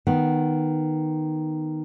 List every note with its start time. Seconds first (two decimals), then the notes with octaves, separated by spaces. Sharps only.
0.07 D#3 B3